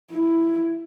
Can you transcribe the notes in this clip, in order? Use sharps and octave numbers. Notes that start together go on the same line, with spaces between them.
E4